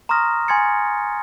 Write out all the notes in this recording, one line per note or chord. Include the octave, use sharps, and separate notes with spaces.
A#5 C6 C#6 D#6 F6 A#6
G#5 C6 G#6 A6 C#7